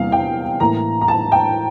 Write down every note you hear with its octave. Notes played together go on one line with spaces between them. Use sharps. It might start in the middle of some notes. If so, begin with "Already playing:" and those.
Already playing: E2 C3 G3 A#3 F5
G5
A2 E3 A#3 A#5
A#5
A5
G5